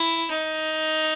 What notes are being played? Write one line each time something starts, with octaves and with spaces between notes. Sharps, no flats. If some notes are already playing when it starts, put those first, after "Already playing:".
Already playing: E4
D#4